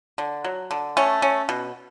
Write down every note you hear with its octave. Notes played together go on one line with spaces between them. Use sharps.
D3
F#3
D3
A3 C#4
C#4
B2